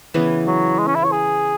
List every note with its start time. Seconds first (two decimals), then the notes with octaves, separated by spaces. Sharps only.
0.14 C#3 E3 B3
0.47 F#3
0.79 G#3
0.87 C#4
0.96 E4
1.04 C#5
1.12 G#4